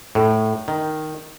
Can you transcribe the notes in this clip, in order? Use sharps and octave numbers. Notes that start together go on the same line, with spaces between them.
A2
D#3